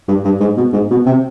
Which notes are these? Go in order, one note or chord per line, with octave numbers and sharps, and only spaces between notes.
G2
G2
G#2
B2
G#2
B2
C3